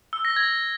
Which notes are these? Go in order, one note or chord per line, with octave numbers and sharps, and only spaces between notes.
E6
A#6
G#6